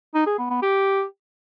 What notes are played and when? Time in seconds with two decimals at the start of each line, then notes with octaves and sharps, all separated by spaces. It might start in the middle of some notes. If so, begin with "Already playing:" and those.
0.14 D#4
0.26 G#4
0.38 B3
0.50 B3
0.62 G4